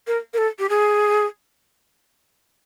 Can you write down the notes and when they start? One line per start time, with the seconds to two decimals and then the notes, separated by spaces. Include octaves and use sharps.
0.07 A#4
0.34 A#4
0.38 A4
0.59 G4
0.69 G#4